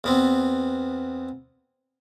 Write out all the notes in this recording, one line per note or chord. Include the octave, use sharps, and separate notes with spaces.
E2 B3 C4